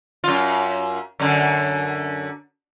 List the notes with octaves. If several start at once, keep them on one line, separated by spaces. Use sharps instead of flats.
F#2 F4
F#2 D3